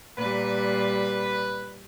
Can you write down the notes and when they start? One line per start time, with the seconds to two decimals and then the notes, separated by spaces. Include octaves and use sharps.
0.18 A#2 G3 B4